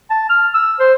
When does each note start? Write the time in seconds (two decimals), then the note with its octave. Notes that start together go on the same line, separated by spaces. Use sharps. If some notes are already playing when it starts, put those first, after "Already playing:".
0.10 A5
0.30 F6
0.54 E6
0.80 C5